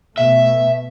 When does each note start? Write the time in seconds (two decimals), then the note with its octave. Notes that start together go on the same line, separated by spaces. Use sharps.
0.18 B2 A3 E5